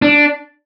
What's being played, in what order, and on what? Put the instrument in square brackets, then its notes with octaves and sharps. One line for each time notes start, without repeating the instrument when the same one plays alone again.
[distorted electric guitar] D4